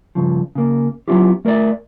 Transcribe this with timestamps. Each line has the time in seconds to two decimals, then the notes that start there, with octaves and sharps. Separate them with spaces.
0.15 G2 C#3 F3
0.55 C#3 A#3
1.08 F#3 B3 C#4 E4 F4 G4
1.45 A3 A#4 C5 D5 E5